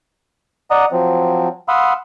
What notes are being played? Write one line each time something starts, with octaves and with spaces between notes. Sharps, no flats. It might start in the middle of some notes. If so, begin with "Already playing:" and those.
D5 D#5 F#5 A#5 D#6
F3 F#3 C4
F5 F#5 B5 C6 D#6 E6